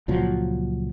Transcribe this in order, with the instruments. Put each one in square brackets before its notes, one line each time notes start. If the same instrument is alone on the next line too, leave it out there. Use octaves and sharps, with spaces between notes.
[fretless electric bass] C#2 A#2 F3 F#3